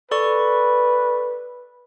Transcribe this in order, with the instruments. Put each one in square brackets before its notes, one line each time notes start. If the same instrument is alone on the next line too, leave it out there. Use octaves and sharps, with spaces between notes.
[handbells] A4 D5 C#6 [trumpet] B4